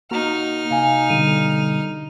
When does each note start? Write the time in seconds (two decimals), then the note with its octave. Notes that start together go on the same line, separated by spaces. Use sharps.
0.11 A#3 D#4 F#4 A#5 F6
0.71 C3 F5 G#5
1.10 B2 D3 G3 D#7